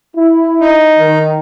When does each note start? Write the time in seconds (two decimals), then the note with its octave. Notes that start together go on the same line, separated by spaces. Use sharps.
0.16 E4
0.61 D#4
0.99 D#3